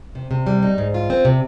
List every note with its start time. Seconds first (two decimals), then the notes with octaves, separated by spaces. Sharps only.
0.15 C3
0.31 C3
0.47 G3
0.63 D#4
0.78 G#2
0.94 F4
1.10 C4
1.25 C3